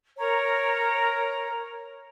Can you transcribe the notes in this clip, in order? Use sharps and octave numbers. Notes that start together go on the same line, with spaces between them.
A#4 C#5 A#5